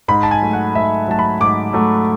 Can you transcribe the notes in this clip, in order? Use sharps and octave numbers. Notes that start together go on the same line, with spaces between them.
G#2 B5
A5
G#5
F#3 A3
F#5
G#2 E5
F#3 A3 A5
B5
G#2 D6
F#3 A3